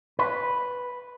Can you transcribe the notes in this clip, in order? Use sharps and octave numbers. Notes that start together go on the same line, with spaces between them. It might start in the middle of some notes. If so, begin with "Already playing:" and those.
B4